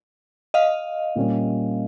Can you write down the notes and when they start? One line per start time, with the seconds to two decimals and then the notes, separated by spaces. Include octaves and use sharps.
0.54 D#5 F5
1.16 A#2 G3 A#3 C#4